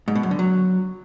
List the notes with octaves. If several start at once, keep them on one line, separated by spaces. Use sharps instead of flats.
G#2
B2
F#2
D3
F#3